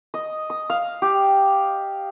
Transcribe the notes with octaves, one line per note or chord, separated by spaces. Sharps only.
D#5
D#6
F5
G4